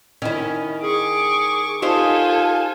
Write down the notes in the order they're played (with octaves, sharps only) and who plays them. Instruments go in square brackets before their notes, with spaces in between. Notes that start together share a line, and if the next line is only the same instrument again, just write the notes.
[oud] D#3 E4 [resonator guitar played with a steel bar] C#4
[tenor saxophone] G#4 [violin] C#6 D6
[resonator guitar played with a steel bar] D#4 G4 C5 [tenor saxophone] F4 [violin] A4 G#5